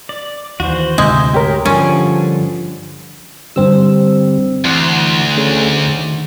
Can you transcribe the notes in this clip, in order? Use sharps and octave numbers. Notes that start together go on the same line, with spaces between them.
D5
D#2 E3 F#4 C5
D2 G#2 C3 G#3 E5 E6 G6
G4 A#4 C#5 G5
G2 D3 F3 G3 C#4 G#5
G2 D3 G3 C4 E6
D2 E3 F#5 C6
A3 C#4 G#4
D#3